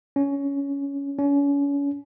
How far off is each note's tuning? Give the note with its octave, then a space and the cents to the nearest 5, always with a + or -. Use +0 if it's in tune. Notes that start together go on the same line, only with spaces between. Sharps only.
C#4 +15
C#4 +35